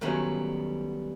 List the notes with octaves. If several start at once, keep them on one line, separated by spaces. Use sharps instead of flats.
D#3 F#3 G3 A3 B3 C#4